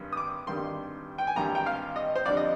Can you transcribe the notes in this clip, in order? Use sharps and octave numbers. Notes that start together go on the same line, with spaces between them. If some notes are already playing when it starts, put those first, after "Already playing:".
Already playing: G#1 G2 D#3 G3
D#6
D6
G#1 G2 D#3 G3 C6
G5
G#5
G#1 G2 D#3 G3 A#5
G5
F5
D#5
C5
F2 D3 G3 D5
D#5